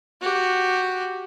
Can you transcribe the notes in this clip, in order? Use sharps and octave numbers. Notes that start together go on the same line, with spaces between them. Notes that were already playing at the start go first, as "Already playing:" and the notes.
F#4 G4